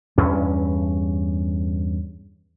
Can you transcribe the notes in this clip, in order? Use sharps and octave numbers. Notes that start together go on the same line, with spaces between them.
E2 G2 C#4